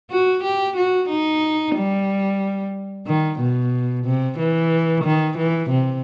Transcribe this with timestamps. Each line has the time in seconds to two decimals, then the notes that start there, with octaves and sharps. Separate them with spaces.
0.11 F#4
0.44 G4
0.77 F#4
1.09 D#4
1.76 G3
3.07 D#3
3.40 B2
4.05 C3
4.39 E3
5.04 D#3
5.38 E3
5.70 C3